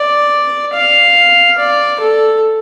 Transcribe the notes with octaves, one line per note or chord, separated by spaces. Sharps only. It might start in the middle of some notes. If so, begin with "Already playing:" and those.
Already playing: D5
F5
D5
A4